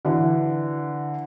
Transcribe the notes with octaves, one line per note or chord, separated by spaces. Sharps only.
D3 E3